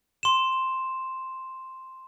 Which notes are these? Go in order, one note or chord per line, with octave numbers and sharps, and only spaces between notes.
C6 E7